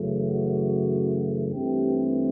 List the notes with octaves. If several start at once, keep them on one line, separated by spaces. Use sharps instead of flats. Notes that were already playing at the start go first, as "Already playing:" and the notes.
Already playing: F#2 C#3 E3 A3
F#4
G2 E3 A3 C4 G4